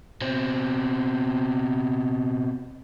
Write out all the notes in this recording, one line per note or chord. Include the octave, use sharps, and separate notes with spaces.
B2 C4